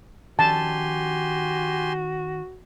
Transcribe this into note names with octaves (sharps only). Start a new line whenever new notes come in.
D#3 F3 C#4 F#4 G4 G#5 A5 C6